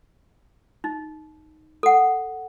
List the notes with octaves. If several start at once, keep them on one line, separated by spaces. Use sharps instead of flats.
D#4
A4 F#5